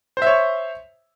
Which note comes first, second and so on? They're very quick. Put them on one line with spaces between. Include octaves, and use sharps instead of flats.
C5 E5 C#5